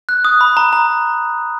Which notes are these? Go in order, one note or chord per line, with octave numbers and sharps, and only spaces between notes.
F#6
D#6
B5
A#5
A#5